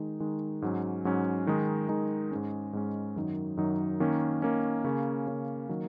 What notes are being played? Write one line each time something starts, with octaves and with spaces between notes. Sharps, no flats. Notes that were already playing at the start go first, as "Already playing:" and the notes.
Already playing: D#3 G#3 D#4
D#3 G#3 D#4
G#2 F#3 C#4
G#2 F#3 C#4
D#3 G#3 D#4
D#3 G#3 D#4
G#2 G#3 C#4
G#2 G#3 C#4
F#2 D#3 F#3 D#4
F#2 D#3 F#3 D#4
D#3 A#3 C#4
D#3 A#3 C#4
C#3 A#3 C#4
C#3 A#3 C#4
D#3 F#3 A#3